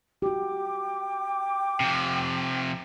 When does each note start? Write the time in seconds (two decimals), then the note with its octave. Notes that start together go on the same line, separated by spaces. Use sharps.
0.22 F#4 G4 G5 D6
1.80 C3 F3